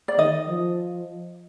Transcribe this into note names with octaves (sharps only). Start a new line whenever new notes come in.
D5
D#3 D#5
F3